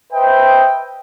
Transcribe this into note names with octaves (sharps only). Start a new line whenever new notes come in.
B4 C5 D#5 E5 G5